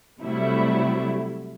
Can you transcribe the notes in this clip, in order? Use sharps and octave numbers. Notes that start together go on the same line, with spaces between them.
C3 F#3 G3 A3 E4